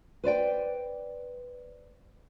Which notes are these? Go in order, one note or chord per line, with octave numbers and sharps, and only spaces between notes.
B4 C5 D5 G5